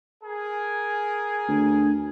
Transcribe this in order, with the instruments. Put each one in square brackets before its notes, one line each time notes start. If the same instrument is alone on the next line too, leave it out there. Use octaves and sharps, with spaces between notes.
[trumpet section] G#4 A#4 G#5
[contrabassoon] D2